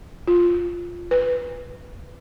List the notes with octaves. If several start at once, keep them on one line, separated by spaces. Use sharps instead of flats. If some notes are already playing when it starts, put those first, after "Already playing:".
F4
B4